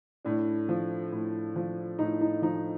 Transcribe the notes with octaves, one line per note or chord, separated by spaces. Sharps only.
A2 D4
F3
A2
F3
A2 D#4
D#4
F3 D#4